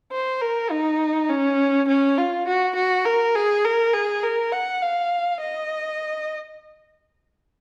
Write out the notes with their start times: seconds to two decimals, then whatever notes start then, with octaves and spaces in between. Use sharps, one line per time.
0.12 C5
0.41 A#4
0.70 D#4
1.29 C#4
1.88 C#4
2.17 F4
2.47 F#4
2.76 F#4
3.05 A#4
3.35 G#4
3.64 A#4
3.94 G#4
4.23 A#4
4.52 F#5
4.82 F5
5.41 D#5